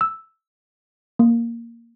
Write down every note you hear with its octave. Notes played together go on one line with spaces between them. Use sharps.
E6
A#3